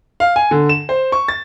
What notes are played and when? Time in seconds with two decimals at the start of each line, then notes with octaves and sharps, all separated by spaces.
0.20 F5
0.36 G#5
0.51 D3
0.69 E7
0.89 C5
1.12 C#6
1.28 A6